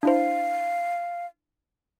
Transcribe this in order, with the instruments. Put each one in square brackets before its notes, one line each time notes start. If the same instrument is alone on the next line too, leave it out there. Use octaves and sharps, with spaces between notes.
[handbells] D4 E4 C5 [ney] F5